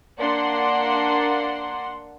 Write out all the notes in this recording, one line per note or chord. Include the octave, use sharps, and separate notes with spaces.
A#3 D4 D5 F#5 C6